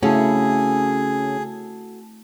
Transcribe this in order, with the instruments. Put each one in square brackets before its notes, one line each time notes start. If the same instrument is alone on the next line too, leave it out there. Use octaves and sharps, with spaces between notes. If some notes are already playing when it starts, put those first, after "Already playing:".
[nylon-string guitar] C#3 C#4 [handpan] A3 C4 E4 [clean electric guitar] F#4 A4 [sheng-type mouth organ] G#4